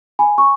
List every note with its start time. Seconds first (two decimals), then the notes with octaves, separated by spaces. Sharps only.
0.19 G#5 B5
0.38 C#6